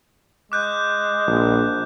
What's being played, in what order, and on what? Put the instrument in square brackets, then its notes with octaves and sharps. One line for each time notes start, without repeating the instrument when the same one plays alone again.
[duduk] G#3 [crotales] D6 F#6 G6
[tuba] A#1